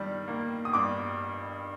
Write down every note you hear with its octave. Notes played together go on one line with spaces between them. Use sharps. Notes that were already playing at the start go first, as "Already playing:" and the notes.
Already playing: G2 D#3 G3
A#3
D#6
G2 D6